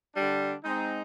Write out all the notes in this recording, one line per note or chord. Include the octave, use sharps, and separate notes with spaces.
D3 G3 D4
G#3 C4 D#4